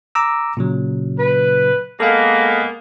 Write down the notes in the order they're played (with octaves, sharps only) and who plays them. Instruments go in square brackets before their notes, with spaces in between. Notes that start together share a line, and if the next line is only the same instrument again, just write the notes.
[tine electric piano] A#5 D6 E6
A#2 C#3 F#3
[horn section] B4
[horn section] G#3 A#3 B3 [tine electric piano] A4 F5